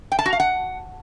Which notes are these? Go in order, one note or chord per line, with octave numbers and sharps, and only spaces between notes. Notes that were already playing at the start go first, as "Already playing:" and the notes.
G5
A5
F#4
F5
F#5